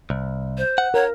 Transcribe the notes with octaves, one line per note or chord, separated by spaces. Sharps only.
C2
C5
F#5
A#4 C#5